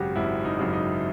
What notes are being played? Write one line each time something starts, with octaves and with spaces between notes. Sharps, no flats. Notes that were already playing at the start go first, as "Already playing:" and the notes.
Already playing: G#1 F#2 C#3 F#4 G4
G#1 E4
D#4
F#2 C#3
D#4